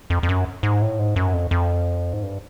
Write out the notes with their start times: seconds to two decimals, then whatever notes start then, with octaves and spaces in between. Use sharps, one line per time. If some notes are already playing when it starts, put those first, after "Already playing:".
0.10 F2
0.23 F2
0.29 F#2
0.63 G#2
0.82 A2
0.99 G#2
1.16 F#2
1.33 F2
1.51 F2
2.13 G#2
2.23 G2